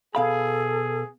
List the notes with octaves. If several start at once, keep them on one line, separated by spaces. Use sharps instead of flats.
B2 G#4 A4 F5 B5